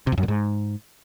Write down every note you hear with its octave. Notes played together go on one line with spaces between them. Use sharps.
C3
F2
F#2
A#2
G#2